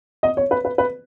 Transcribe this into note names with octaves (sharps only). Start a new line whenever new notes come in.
D#5
C#5
B4
B4
B4